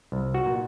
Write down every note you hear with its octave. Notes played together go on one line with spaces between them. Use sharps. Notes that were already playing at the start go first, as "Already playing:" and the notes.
C2
F#4
A#2